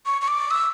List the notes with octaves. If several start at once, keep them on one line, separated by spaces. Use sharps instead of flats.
C#6
C#6
D6
E6